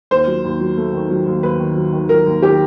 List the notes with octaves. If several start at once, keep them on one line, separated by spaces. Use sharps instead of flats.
D#2 C5
F#3
D#2
F#3
A3
D#3
F#3
D#2
D#2 B4
D#3
F#3
D#3
F#3 A#4
D#2
D#3 G4